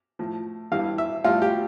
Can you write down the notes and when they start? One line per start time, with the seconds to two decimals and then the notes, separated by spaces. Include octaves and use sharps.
0.19 A2 F3
0.72 G2 E3 G3 F5
0.98 E5
1.24 A2 G3 F4
1.42 G4